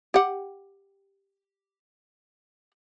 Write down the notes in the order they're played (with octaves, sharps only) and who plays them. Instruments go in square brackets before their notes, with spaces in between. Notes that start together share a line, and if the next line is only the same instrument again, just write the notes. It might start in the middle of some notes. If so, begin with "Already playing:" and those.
[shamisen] G4 F#5